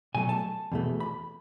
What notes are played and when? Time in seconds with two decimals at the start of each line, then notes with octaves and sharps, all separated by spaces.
0.15 B2 F#3 A3 G#5
0.29 A5
0.72 E2 B2 A3
1.00 B5